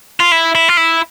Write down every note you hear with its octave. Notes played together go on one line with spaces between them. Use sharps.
F4
E4
E4
F4
E4